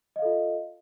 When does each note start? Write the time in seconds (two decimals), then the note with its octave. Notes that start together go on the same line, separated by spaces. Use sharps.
0.16 D#5
0.19 F5
0.22 A4
0.25 F4